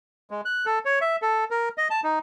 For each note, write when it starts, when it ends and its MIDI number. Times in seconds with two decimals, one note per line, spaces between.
0.31 0.41 56
0.45 0.66 90
0.66 0.79 69
0.85 0.99 73
1.01 1.16 76
1.22 1.44 69
1.51 1.69 70
1.78 1.88 75
1.90 2.00 81
2.04 2.19 63